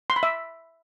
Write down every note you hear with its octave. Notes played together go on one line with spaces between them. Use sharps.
C6
B5
E5